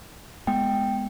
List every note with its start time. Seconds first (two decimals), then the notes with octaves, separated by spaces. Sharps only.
0.47 G#3 B3 G5